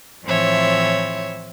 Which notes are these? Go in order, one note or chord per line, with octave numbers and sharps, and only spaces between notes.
A2 E3 F3 C4 C#5 E5